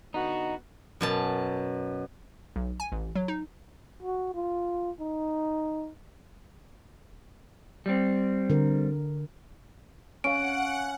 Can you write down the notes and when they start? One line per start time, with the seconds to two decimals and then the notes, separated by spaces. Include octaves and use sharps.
0.14 D3 B3 D#4 F#4
1.01 F#2 B2 A5
2.56 B1
2.80 G#5
2.92 A1
3.15 F#3
3.28 D#4
4.03 F#4
4.34 F4
5.00 D#4
7.86 G3 C4
8.50 D3 A#4
10.24 C#4 F5 F#5 D7